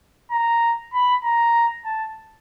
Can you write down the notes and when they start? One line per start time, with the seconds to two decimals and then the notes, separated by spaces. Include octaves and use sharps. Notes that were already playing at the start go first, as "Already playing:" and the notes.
0.31 A#5
0.94 B5
1.24 A#5
1.85 A5